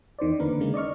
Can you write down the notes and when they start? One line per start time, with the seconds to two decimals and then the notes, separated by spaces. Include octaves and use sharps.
0.19 E2 D#3 C5 D5
0.39 D3 D#3 A#3 A#4 B4
0.60 C#3 G#3 A#3
0.74 D5 D#5 C#6 F6